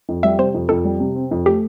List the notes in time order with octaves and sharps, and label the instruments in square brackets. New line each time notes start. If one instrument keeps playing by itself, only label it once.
[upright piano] F2
[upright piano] G3 [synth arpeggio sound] E5
[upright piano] C3 [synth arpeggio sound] C5
[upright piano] F2
[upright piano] F2 [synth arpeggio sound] A4
[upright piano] G3
C3
C4
F2
[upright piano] A3 [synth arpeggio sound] G4